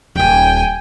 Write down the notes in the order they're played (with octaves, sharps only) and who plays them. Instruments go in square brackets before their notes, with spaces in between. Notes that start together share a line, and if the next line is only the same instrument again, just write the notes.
[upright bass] D#1 D#2 [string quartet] G5 G#5